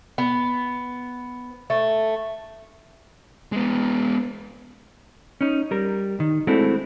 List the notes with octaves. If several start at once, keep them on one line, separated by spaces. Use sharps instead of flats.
B3
A3
G#3 B3
C#4 D#4
G3 A#4
D#3
G#3 A3 C4 D4 E4 F#4